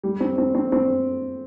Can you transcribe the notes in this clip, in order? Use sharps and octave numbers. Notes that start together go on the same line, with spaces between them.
G3
C4
C4
C4
C4